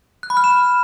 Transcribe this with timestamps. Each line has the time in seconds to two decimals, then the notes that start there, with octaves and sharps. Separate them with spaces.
0.23 F#6
0.30 B5
0.37 F6
0.44 E7